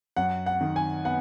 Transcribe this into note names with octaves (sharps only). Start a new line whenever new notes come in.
F#2 F#5
F#5
D#3
G#5
B3 F#5